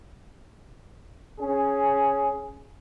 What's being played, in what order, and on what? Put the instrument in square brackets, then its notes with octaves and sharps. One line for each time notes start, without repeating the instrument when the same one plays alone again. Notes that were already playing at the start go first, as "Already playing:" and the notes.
[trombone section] C#4 G#4